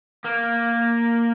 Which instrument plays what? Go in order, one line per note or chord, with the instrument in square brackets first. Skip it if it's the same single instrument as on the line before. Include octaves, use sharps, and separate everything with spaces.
[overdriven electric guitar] A#3